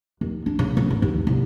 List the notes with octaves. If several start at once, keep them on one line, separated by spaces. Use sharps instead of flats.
D#2
D4
C#3
C#3
G#1
D#2
C2